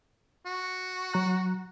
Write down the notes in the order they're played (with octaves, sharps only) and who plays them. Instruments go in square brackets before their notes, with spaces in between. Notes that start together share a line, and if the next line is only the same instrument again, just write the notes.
[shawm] F#4
[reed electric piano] F#3 A#5 F#6